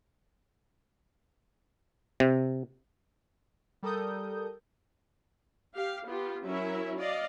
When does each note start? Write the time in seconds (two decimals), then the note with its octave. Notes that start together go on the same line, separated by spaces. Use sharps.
2.20 C3
3.83 G3 A4 A#4 D#6 G6
5.74 G4 F5
6.06 B3 F4 G4
6.44 F#3 C#4 E4 A#4 E5
6.96 D5 D#5 F5